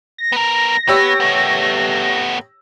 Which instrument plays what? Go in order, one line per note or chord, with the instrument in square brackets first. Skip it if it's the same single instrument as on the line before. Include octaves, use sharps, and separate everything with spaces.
[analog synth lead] A#6
[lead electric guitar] B3 A#4
[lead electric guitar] B3 [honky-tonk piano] G4 C#5 E6
[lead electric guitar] A3 B3